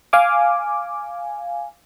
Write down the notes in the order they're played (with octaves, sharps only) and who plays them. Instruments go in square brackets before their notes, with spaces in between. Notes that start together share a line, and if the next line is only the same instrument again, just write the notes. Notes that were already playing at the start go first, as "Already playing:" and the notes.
[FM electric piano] F5 G#5 D6